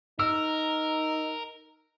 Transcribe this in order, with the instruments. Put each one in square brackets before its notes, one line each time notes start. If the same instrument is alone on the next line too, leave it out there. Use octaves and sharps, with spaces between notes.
[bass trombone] D#4 [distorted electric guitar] A#4 [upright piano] E6